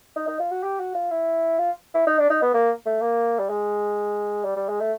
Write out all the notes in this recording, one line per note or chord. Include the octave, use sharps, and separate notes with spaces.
D#4
D#4
F4
F#4
G4
F#4
F4
E4
F4
E4
D#4
D4
D#4
B3
A#3
A3
A#3
G3
G#3
G3
G3
G#3
A3